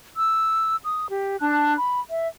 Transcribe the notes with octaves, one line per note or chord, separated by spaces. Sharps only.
E6
D#6
G4
D4 A5 F#6
B5
E5